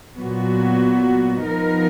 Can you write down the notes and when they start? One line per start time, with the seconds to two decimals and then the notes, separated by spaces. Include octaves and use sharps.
0.15 A#2 F#3 B3 F#4
1.45 F3 B3 D#4 A#4